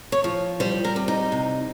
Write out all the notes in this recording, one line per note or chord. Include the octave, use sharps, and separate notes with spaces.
C#5
F3
G3 C5
A#4
C3
D#4
C3